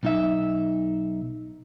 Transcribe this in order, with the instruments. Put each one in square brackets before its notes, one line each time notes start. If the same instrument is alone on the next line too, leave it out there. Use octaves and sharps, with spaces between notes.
[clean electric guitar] B1 D#4 E5